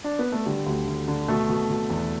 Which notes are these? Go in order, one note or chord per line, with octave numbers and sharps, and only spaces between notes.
D4
B3
A3
D3 G3
D2
D2
D3
B2 A3
B2
B2
E2